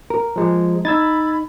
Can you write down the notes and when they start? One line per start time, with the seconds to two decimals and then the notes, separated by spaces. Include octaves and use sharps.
0.10 A#4
0.36 F3 G#3
0.85 D#4 B5 E6 G#6 A6